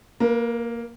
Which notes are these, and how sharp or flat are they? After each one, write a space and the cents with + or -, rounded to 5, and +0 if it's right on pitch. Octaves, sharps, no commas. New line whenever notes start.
A#3 +0 B4 -40